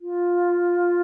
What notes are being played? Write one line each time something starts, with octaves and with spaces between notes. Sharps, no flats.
F4